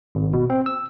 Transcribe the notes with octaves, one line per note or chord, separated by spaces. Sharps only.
G#1
B2
C4
E6